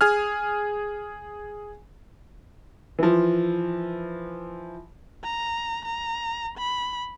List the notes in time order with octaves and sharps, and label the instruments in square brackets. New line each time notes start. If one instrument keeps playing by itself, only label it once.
[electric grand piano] G#4 G#5 F6
[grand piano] E3 F3
[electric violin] A#5
A#5
B5